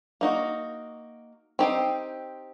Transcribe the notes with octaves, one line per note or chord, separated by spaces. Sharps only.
A#3 D#4 F#4
C4 D#4 G4 C5